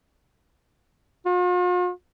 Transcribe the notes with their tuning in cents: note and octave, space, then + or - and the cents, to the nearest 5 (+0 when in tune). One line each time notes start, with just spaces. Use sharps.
F4 +45